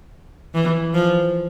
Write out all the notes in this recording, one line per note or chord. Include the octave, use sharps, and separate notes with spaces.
E3
F3